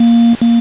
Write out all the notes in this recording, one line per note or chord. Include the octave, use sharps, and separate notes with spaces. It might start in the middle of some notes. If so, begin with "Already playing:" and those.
Already playing: A#3
A#3